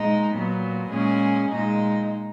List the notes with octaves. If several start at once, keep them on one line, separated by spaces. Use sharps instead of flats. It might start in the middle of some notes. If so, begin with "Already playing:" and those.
Already playing: A#2 G#3 D#4
A#2 F#3 B3
A#2 G#3 C#4 G#4
A#2 G#3 D#4